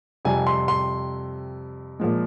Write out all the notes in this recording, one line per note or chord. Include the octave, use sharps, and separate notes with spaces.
F2 C3 G3 G#5
C6
C6
A#2 F3 G#3